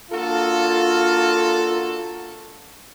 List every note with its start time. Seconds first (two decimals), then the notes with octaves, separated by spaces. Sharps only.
0.11 A#3 D4 F4 F#4 A4